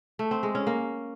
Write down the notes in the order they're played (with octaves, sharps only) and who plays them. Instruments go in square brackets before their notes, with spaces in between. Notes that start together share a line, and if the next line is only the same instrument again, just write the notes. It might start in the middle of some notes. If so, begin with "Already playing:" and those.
[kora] A3
C4
G#3
C#4
A#3